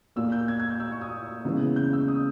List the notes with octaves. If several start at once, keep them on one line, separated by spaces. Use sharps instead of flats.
A#2 A#3 E6
G6
G#6
G#6
G6
E6
C#6
D#6
C#3 E3 G#3 B3
G6
E6
D#6